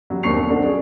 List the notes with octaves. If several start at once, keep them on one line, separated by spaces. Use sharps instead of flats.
F#3 G3
D#2 C4 D4 C#6 C7 F7
B1
C4 D4 F#4 A4
C#4 G#4 D5